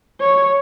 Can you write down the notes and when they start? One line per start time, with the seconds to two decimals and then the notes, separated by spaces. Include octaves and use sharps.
0.20 C#5